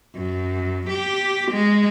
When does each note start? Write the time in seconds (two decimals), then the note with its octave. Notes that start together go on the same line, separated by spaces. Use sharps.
0.15 F#2
0.89 G4
1.52 G#3